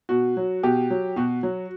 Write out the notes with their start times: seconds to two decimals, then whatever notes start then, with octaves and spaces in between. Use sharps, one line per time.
0.09 B2 F#4
0.37 F#3
0.63 B2 G4
0.90 F#3
1.16 B2 F#4
1.43 F#3